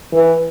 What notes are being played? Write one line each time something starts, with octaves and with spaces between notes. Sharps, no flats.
E3